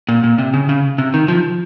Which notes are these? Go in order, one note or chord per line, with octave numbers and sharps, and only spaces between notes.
A#2
A#2
C3
C#3
C#3
C3
D#3
F3